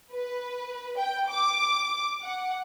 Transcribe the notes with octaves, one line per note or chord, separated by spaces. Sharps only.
B4
G5
D6
F#5